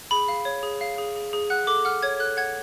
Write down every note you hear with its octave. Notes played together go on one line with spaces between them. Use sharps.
G#4 B5
F5
C#5
G#4
F5
G#4
G#4
G#4
F#5 F#6
A4 D6
F#5 F6
C#5 G#6
A4 F#6
F#5 G#6